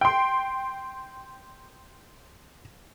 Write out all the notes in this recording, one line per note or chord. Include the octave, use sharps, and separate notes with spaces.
G5 C6